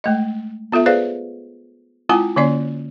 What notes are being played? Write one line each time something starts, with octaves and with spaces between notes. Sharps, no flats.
G#3 A3 D#5
B3 F4 A4 E5
G#4 B4 C5 D5 F5
G#3 C4 E4 F4 F#5 G#5
D3 A#3 C#4 C#5 D5